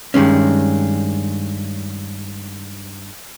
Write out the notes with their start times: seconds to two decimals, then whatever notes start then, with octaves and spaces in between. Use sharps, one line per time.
0.14 G2 D#3 G#3 C#4